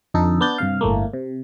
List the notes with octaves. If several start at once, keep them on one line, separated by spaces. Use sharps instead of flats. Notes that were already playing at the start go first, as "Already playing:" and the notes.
F2 D3 D#4 A4
B3 D4 G6 A6
G2 C3 F5
G1 A2 A3 A#3
C3